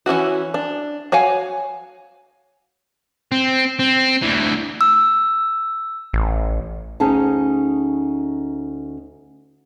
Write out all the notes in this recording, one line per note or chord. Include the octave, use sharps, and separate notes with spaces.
E3 C#4 E4 F#4
D4
F#4 C#5 F5 G#5
C4
C4
D2 E3
E6
A1
D2 C#4 D#4 G#4 A5